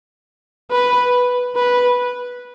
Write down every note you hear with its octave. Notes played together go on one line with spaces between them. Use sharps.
B4
B4